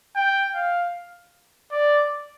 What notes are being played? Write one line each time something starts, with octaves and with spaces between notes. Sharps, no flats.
G5
F5
D5